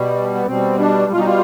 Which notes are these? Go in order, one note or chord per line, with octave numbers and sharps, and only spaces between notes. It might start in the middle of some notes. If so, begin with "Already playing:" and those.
Already playing: B2 G3
B3
B2 G3 C4
D4
B2 G3 D#4 F4
F4